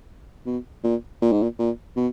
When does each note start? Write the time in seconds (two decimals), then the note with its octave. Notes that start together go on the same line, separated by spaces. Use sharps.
0.46 B2
0.84 A#2
1.22 A#2
1.32 G#2
1.43 A#2
1.59 A#2
1.96 B2